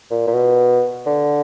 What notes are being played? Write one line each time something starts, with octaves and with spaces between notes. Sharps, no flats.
A#2
A#2
B2
D3